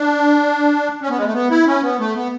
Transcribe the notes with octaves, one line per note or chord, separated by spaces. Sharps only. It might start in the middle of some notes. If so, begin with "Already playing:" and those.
Already playing: D4
C#4
B3
G#3
A3
B3
E4
C#4
B3
A3
B3